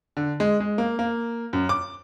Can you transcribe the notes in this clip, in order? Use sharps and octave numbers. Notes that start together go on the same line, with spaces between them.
D3
G#3
G#3
A#3
A#3
F#2
D6